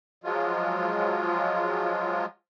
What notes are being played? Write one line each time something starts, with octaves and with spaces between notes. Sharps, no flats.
F3 F#3 G#3 F4